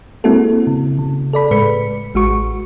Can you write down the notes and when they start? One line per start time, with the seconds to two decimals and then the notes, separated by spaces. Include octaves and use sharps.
0.24 G#3 A#3 C4 E4 F#4 A4
0.67 C#3
0.99 C#3
1.33 A4 D5 B5
1.51 A2 G#3 B4 B5 C#7
2.14 A1 G#3 F#4 C#6